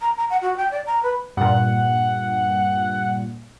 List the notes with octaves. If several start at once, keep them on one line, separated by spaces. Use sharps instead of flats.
A#5
A#5
F#5
F#4
G5
D5
A#5
B4
G2 A#2 F#5